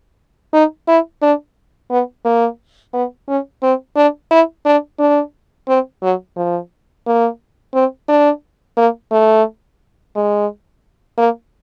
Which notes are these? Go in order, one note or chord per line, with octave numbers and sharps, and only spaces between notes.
D#4
E4
D4
B3
A#3
B3
C#4
C4
D4
E4
D4
D4
C4
F#3
F3
A#3
C4
D4
A#3
A3
G#3
A#3